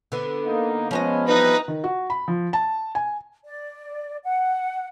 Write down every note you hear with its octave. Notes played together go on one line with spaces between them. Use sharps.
D3 B3
A#3 D#4
F3 G#3 B3 C#4 D#5
F2 E3 G3 D#4 B4 A#6
D#3
F#4
B5
F3
A5
G#5
D5
F#5